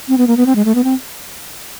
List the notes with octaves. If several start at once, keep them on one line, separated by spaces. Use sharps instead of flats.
C4
B3
A#3
B3
C4
G#3
A3
B3
C4